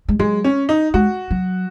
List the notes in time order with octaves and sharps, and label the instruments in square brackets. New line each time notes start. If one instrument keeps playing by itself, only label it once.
[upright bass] G#3
[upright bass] F#3 [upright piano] G#3
[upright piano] C#4
D#4
[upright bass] G#3 [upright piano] F#4
[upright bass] F#3